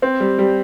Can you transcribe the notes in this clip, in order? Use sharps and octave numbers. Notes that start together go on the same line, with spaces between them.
C4
G3
G3